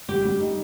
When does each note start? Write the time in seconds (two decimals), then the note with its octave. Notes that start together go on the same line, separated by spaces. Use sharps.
0.09 G3 G4
0.25 G3
0.40 D#4